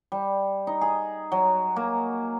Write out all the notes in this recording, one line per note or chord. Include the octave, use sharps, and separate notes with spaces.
G3
D#4
G#4
F#3
A#3